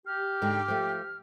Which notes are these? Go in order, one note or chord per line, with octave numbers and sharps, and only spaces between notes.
G4 F6
G#2 D3 G#3 G5
F3 A3